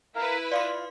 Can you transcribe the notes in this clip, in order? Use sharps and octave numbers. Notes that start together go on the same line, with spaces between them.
E4 A#4 B4 F5
F4 D5 F5 C6